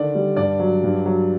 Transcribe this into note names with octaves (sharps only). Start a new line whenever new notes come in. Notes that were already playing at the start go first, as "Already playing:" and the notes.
Already playing: D3 D#3 D5
G3
G2 D5
F#3
G2
F#3